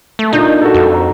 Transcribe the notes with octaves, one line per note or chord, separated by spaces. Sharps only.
A3
A#2 D4 D#4 G6
F#4 A4
F2
A#5